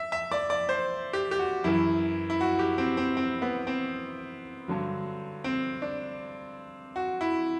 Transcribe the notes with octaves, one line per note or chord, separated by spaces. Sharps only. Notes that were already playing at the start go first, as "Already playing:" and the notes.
Already playing: E5
E5
D5
D5
C5
G4
G4
F#4
F#2 E3 E4
E4
F#4
G4
C4
C4
C4
B3
C4
G2 D3 F#3
C4
D4
F#4
E4